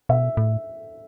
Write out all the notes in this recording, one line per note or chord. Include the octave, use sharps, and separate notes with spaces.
B2 E5
A2